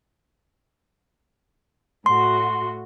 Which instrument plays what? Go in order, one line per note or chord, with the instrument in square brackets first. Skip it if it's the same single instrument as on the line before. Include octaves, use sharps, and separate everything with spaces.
[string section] A2 F#4 [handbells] C6